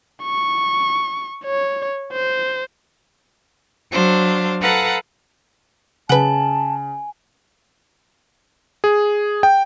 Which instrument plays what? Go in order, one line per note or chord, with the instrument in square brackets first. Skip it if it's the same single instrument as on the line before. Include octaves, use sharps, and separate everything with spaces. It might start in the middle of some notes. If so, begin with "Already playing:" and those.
[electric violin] C#6
C#5
C5
[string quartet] F#3 D4 C5 F5
A4 B4 F5 F#5 A#5
[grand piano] C#3 F#7 [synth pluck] B4 F#5 [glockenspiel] G#5 [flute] A5
[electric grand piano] G#4
G5